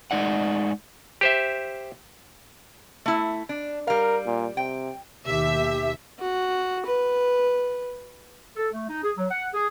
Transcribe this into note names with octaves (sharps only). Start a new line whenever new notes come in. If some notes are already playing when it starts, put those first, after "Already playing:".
G#3 D#4 D5 F#5
G4 C5 E5
A3 E4
D4
G3 A#4 F5
A#2
C3 G5
D#2 B2 G4 E5
F#4
B4
A4
A3
D#4
G#4
F#3
F#5
G#4